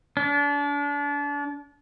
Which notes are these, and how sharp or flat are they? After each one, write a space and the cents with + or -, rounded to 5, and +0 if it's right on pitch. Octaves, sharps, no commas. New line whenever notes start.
D4 -35